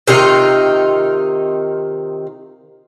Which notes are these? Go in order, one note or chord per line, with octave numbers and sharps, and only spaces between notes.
C3 D#3 D#4 F4